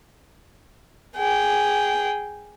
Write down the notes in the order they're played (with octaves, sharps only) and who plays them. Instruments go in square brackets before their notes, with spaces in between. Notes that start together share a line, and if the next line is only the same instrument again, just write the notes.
[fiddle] G#4 G5